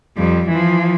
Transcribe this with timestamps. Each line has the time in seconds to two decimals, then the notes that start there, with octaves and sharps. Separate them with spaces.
0.17 F2 G3
0.49 E3 F3